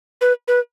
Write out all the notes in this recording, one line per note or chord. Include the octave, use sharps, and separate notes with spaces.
B4
B4